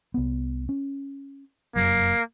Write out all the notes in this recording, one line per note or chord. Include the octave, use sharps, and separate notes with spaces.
C2 B3
C#4
F1 F#2 F#3 A#3